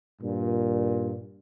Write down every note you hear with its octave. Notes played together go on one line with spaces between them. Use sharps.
G2 A#2